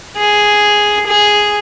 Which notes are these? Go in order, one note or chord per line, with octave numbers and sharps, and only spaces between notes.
G#4
G#4